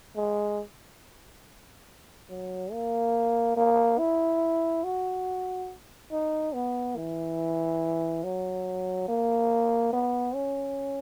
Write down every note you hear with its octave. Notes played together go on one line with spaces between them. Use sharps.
G#3
F#3
A#3
A#3
E4
F#4
D#4
B3
E3
F#3
A#3
B3
C#4